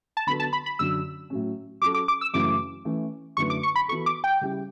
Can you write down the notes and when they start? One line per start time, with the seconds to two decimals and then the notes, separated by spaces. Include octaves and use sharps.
0.17 A5
0.27 D3 F#3 B3 F#4 A4 B5
0.40 A5
0.53 B5
0.66 B5
0.79 F#2 D3 F#3 E6
1.30 A2 F#3 C#4
1.82 F#3 C#4 F#4 A4 D6
1.94 D6
2.08 D6
2.21 E6
2.34 F#2 C#3 E3 A3 E4 D6
2.85 E3 A3 C#4
3.37 F#2 D3 A3 E4 B4 C#6
3.50 D6
3.63 C#6
3.76 B5
3.88 E3 B3 F#4 A4 C#6
4.06 D6
4.24 G5
4.41 C#3 G3 C#4 E4 G4